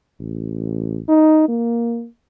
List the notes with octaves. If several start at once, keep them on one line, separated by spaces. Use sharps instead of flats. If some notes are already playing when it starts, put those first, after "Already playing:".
A1
D#4
A#3